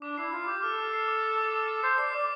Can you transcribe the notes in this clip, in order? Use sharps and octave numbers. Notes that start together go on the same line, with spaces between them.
D4 D6
E4 C7
F4 C7
G4 D6
A4 F6
D6
C7
D6
D6
D6
D6
D6
C5 C7
D5 C7
D5 D6